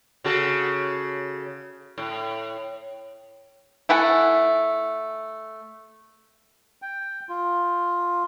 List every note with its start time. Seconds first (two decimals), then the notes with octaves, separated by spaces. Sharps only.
0.24 C#3 F#4 A4
1.98 A2
3.89 A3 E4 F#5 G#5
6.82 G5
7.29 F4